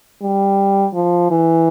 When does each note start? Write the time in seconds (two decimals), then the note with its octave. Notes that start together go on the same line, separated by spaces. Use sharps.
0.22 G3
0.94 F3
1.31 E3